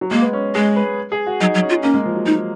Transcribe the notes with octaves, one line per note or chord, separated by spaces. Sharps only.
F#3
G#3 A#3
B3
C#4
G#3 G#4
B4
G#4
F#4
F#3 D#4
F#3
C#4
F4
A#3 C#4
G#3
F3
F#3
G#3 D#4